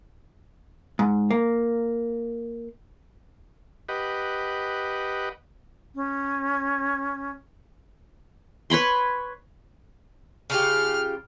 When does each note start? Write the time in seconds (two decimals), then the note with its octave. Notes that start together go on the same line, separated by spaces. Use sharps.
0.99 G#2
1.31 A#3
3.89 G4 B4 D#5 F#5
5.95 C#4
8.70 B4 C#5 B5 C6
10.50 C#3 F4 G4 F6